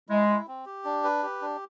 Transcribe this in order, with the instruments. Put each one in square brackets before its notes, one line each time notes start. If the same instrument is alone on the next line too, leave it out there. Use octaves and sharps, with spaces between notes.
[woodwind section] G#3 [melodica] E4
[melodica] E4
C4
G4
D4
B4
G4
D4